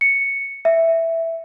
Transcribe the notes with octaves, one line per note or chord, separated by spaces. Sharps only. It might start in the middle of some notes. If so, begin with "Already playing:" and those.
C#7
E5